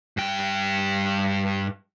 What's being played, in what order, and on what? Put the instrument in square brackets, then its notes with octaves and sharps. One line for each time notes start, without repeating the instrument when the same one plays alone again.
[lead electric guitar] G2 G5